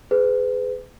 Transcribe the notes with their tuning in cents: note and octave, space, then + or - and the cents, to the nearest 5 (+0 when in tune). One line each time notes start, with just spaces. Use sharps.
G#4 +10 B4 +35